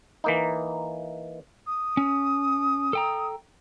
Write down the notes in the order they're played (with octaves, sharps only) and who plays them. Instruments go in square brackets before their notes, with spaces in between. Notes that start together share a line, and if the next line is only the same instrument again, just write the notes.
[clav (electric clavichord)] E3 A#3 D#4
[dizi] D#6
[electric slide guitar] C#4
A4 G5 A#5